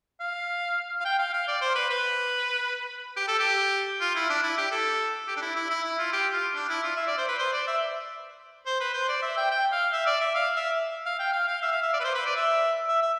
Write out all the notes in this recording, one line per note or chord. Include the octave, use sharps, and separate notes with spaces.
F5
F5
G5
F5
F5
D5
C5
B4
B4
G4
A4
G4
F4
E4
D4
E4
G4
A4
G4
D4
E4
E4
E4
E4
F4
G4
F4
D4
E4
F4
E5
D5
C5
B4
C5
D5
E5
C5
B4
C5
D5
E5
G5
G5
F5
E5
D5
E5
F5
E5
F5
G5
F5
F5
E5
F5
E5
D5
B4
C5
B4
D5
E5
E5
E5